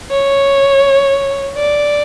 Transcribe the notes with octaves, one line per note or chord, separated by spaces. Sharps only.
C#5
D5